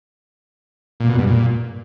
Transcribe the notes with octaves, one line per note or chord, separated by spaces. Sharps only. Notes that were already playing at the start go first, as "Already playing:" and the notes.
A#2
B2
G2
A#2